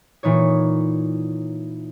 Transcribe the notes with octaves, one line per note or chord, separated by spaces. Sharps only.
A#2 E3 D#4 C#5